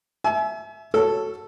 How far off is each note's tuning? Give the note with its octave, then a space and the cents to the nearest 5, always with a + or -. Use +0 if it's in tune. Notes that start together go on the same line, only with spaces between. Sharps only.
E5 +0 G#5 +40
F#4 +0 A4 +0 C#5 +0